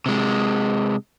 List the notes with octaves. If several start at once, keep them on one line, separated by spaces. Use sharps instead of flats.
C3 G#3